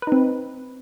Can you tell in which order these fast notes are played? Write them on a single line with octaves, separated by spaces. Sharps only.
B4 D#4 C4